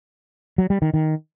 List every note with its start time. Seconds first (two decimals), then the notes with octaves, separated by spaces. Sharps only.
0.58 F#3
0.70 G3
0.82 D#3
0.94 D#3